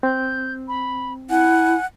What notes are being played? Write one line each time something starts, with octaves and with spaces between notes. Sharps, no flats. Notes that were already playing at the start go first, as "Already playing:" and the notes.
C4 G6
B5
E4 F#5 G#5